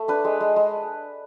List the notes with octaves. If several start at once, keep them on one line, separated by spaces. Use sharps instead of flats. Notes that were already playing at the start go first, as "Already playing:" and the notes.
Already playing: A3
D4 B4
G#3
G#3
G#3